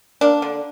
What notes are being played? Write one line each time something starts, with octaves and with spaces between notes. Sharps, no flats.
A#3 D4
D3